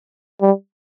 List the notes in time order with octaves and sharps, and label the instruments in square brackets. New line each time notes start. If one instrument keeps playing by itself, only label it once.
[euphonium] G3